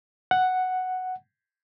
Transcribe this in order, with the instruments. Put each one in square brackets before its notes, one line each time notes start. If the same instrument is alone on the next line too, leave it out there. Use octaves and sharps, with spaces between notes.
[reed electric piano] F#5